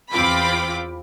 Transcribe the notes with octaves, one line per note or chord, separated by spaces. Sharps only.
E2 C4 F4 B5 D6